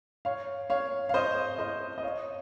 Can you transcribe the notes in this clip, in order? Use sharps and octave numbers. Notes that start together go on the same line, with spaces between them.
C#5 F5
C#5 F5
F5
C5 D#5
C5 D#5
D#5
C#5 F5